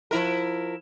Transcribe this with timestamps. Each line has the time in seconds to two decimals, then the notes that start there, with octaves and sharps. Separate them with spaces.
0.11 F3 E4 A#4